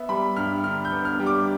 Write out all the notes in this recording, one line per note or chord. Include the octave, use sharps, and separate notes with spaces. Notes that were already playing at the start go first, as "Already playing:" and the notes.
Already playing: B3 E5
G3 B5
G2 F6
D3 F6
G6
B3
F6
G3
D6